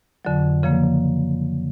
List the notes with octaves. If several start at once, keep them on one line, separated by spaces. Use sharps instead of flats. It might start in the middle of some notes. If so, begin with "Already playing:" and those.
F2 D3 F#3
C#3 F3 A#3